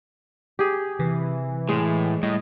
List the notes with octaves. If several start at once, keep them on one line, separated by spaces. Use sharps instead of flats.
G4 G#4
C3 E3
A2 G#3
A2 G3 D#5